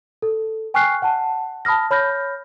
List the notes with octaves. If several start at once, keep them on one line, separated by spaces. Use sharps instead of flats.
A4
G5 G#5 C#6 F6 F#6 C7
F#5 A5
A5 B5 D#6 F6 A#6
C#5 B5 F6 G6 A#6